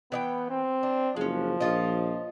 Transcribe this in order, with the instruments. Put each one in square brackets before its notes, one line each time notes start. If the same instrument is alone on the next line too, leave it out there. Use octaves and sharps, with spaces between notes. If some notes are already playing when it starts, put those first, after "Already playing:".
[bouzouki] E3 D#5 G5 [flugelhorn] B3
[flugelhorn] C4
[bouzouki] D4
[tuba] F#1 [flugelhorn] F3 [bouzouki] G#3 C#4
[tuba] A#1 [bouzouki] C#4 F4 D#5